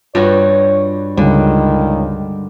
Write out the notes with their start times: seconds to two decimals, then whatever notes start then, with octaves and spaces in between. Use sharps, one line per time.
0.15 G2 G3 F4 F#4 C#5
1.17 C#2 D3 D#3 G3